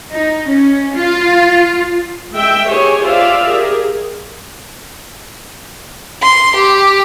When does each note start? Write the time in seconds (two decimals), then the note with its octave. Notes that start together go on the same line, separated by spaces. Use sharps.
0.13 D#4
0.49 C#4
0.95 F4
2.33 G#3 E5 G5
2.67 G4 G#4 C#5 G#5
3.03 F4 G4 C5 D5 E5 F5
3.45 G4 G#4 A#4
6.23 C6
6.55 G4